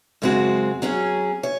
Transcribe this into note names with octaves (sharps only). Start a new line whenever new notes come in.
F#2 C#3 G#3 C4 F#4
F#3 C#4 G#4
C#5